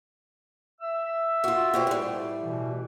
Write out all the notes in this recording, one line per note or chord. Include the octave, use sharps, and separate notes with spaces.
E5 E6
F4 F#4
B2 G4 C5
A2 G3
B2 E3